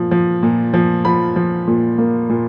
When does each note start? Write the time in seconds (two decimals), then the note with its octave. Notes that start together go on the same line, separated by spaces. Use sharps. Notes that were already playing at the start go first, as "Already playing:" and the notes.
Already playing: A#2 F3
0.11 F3
0.43 A#2
0.74 F3
1.05 F3 B5
1.36 F3
1.67 A#2
1.98 A#3
2.29 A#2